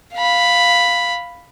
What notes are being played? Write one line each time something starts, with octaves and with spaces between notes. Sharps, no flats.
F5 B5